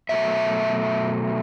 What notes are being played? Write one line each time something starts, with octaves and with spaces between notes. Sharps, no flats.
B2 F#3 A3 E5